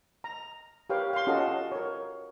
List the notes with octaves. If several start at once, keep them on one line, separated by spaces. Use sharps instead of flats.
A#5
G4 A#4 B4 C#5 F5 G5
F5 C6
C#4 F4 F#4 A4 D#5
A#4 C#5